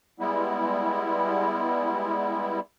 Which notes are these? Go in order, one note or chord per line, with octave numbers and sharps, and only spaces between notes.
G3 G#3 B3 E4